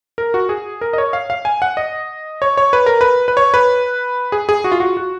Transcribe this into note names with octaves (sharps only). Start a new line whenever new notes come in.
A#4
F#4
G#4
A#4
D#5
C#5
F5
F5
G#5
F#5
D#5
C#5
C#5
B4
A#4
B4
B4
C#5
B4
G#4
G#4
F#4
F4
F#4
F#4